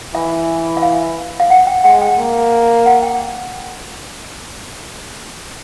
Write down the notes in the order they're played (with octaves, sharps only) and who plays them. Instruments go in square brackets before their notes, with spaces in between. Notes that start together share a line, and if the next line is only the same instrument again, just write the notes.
[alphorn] E3 [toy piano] E5
[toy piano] E5
F5
F5
F#5
G5
[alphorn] G#3 [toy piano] F#5
[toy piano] G5
[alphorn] A#3
[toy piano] F#5
G5